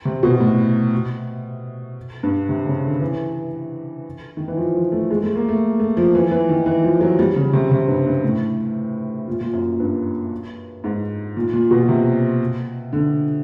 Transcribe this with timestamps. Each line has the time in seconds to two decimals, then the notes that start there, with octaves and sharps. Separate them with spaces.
0.05 C3
0.23 B2
0.40 A2
2.23 G2
2.49 C3
2.66 C#3
2.84 D3
3.01 E3
4.37 D#3
4.48 E3
4.57 F3
4.75 F3
4.92 A3
5.11 G#3
5.23 A3
5.36 A#3
5.49 A3
5.80 A3
5.97 F3
6.15 E3
6.31 E3
6.49 D#3
6.66 E3
6.84 F3
7.01 F#3
7.19 G3
7.36 C#3
7.53 C3
7.71 C3
7.88 G2
8.06 G2
8.23 A2
9.28 A#2
9.41 A#2
9.53 F#2
9.80 G2
10.84 G#2
11.37 A#2
11.53 A#2
11.71 B2
11.89 C3
12.93 D3